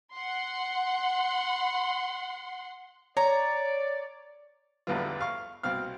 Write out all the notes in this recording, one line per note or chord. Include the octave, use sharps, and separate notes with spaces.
F#5 C6
C#5 D5 A#5
A1 E2 D3 E3 G3 F4
F5 C#6
C2 B2 C4 F5 F6